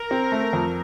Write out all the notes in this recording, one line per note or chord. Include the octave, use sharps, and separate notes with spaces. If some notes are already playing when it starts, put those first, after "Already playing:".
Already playing: A#4
C4
A3
F2